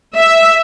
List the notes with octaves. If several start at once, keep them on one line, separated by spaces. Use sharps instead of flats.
E5